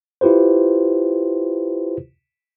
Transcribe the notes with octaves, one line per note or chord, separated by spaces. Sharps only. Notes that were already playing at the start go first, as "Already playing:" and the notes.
E4 F4 G4 B4 C5